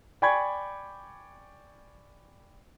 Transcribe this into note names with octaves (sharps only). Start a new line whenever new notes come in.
D5 G5 G#5 B5 C#6 G#6